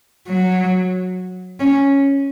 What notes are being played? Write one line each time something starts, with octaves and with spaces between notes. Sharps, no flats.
F#3
C#4